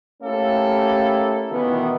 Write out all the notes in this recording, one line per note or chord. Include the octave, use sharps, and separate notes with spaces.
A3 A#3 C#4 E4 G4 A4
B2 D#3 E3 B3